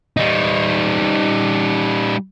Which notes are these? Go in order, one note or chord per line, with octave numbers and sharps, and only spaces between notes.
G3 D#4